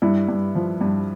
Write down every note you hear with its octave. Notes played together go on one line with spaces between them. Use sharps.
G2 E4
G2
F3
G2